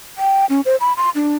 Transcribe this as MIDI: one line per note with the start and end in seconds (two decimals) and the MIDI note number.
0.18 0.46 79
0.50 0.61 61
0.65 0.76 72
0.80 0.93 83
0.97 1.10 84
1.15 1.37 62